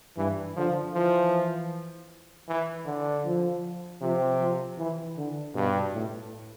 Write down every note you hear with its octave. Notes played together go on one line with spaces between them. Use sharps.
G2 E3
D3 F3
E3 F3
E3
D3
F3
C3 F3
F3
E3
D3
G2 B2
A2